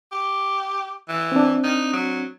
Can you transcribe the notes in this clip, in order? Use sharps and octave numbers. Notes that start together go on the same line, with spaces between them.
G4
E3
C4 D4
D#4
F#3